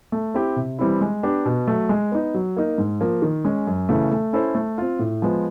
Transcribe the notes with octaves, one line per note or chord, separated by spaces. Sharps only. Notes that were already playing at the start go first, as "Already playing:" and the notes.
A3
C4 E4 G4
C3
E3 G3 C4 E4
G#3
B3 D4 G4
B2
F#3 A3
G#3
B3 D#4
F#3
A#3 D#4
G#2
F3 A#3
D#3
G#3 C#4
F#2
C#3 E3 A3
A3
C#4 E4 A4 C5
A3
C4 F4
A2
F3 G#3 B3